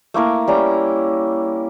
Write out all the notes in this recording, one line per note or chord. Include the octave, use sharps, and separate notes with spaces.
A3 A#3 E4 A#4
G3 C#4 A#5